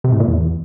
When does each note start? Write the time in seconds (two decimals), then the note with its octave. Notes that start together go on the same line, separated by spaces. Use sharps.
0.04 C3
0.12 A2
0.20 A#2
0.28 E2